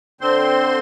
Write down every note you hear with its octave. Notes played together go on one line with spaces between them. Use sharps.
D3 C4 C5 C6